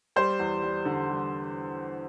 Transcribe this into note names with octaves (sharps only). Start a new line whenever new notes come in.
G3 C5
E2
G3
D3
G3